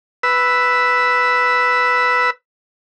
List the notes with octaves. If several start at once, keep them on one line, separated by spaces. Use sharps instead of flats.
B4 E6